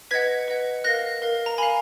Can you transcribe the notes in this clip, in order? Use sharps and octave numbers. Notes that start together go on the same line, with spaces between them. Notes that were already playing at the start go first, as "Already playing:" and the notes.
B4 D#5 F#5 G#6 B6
B4 D#5 F#5
A#4 F5 F#6 A#6
A#4 F5
A#5
A#4 F5 G#5 B5